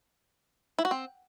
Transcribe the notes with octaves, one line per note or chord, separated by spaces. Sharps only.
E4
F#4
C4